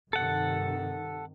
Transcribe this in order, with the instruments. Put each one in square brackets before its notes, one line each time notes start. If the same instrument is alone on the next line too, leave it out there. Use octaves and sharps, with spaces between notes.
[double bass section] G2 C3 D#3 [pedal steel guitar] A4 F#5